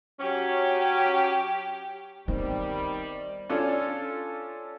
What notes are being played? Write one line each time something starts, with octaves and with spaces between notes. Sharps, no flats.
F#3 C#4 G4
D#3 G3 B3 C4 C5
C#4 D4 F4 A4